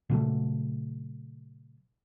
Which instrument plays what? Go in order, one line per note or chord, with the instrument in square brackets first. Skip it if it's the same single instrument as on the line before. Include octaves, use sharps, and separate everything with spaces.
[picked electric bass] A#2 C#3 F#3 A3